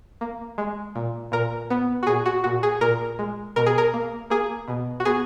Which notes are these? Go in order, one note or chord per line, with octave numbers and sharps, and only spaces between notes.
A#3
G#3
A#2
A#2 A#4
B3
F#4
A#2 G#4
F#4
A#2 F#4
G#4
A#2 A#4
G#3
B2 A#4
G#4
A#4
A#3
A#3 G#4
B2
F#4
B3 G#4